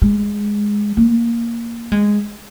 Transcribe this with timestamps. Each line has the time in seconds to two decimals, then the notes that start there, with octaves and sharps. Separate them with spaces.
0.02 G#3
0.97 A#3
1.92 G#3